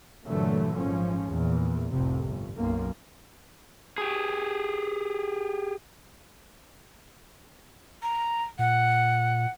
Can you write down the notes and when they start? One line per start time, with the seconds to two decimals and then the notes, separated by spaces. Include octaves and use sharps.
0.26 G2 A#2 D3 E3 F#3 A3
0.77 G#1 F3 C#4
1.27 E2 A#2
1.90 F1 C2 F2 A2 C3
2.23 G1
2.57 B1 F#2 A#3
3.98 G4 G#4
8.03 A#5
8.59 A#2 F#5